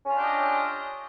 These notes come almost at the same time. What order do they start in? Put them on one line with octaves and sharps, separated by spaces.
C#4 F4 D4 G4 D#5